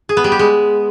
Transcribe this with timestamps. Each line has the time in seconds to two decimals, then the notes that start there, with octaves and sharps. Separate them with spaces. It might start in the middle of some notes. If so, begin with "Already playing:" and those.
0.09 G#4
0.17 B3
0.24 G3
0.32 G4
0.39 G#3